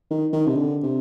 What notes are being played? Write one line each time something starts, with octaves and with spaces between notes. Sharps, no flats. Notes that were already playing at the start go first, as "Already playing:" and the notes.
D#3
D#3
C3
D3
C3